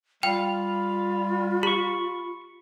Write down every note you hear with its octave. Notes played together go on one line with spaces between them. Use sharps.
G3 F4 F5 G5
G4 B5 C#6